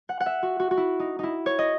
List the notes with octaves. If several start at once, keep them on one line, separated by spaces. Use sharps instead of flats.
F#5
F#5
E5
F#4
F#4
F#4
E4
D#4
D#4 E4
C#5
D#5